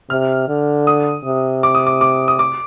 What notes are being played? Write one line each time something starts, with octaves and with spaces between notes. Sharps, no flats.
C3 F6
D3
D#6
C3
D6
D#6
D6
D6
D#6
D6